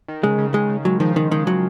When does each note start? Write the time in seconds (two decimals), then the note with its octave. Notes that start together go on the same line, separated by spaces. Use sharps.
0.08 D#3
0.23 C#3 G#3
0.38 C#3
0.54 C#3 G#3
0.70 C#3
0.85 F#3 G#3
1.00 D#3 F3
1.15 D#3 F3
1.31 D#3 G#3
1.47 F#3